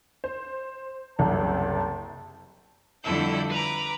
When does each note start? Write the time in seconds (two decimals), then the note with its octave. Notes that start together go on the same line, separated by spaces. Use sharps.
0.24 C5
1.19 F#1 C2 C3 A5
3.04 F2 D3 G3 E4 A4 G6
3.50 B4 A#5 D6